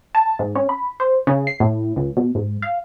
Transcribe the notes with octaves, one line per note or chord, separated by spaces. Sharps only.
A5
G#2
C#4
B5
C5
C#3
C7
A2
C#2
B2
G#2
F5